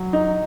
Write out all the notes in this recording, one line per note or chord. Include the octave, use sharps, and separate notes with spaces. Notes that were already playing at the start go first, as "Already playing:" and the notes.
Already playing: F#3
D#4